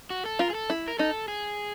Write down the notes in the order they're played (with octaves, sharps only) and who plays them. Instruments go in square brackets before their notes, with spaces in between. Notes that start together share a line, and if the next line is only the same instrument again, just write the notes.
[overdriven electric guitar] F#4
A4
[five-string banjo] F4 [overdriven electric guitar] A#4
[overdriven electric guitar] G#4
A4
[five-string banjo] E4
[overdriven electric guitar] A#4
[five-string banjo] D#4 [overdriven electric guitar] A4
[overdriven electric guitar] G#4